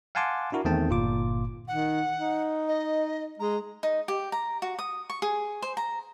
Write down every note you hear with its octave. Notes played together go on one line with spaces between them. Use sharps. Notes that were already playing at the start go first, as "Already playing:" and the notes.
F5 F#5 G#5 A5 C6 D6
D4 E4 F#4 A#4
E2 D#3 A3 C4 G5 A5
G1 A#2 F4 D6
D#3 F#5
D#4
D#5
G#3 A#5
D#4
G4
A#5
F#4
D#6
C#6
G#4
C5
A#5